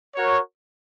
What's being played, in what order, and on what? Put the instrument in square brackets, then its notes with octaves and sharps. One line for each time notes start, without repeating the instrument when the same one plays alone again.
[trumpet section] F#4 A#4 C#5